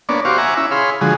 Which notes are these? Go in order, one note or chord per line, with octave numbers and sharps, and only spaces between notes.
A#3 B3 D4 C#5 D5
F#4 G4 C5 F5 C#6 D6
E5 F#5 G#5 A#5 C#6 D6
C#4 E4 E5
G#4 C#5 F5 B5 C6
D3 F3 G#3 F#4 G#4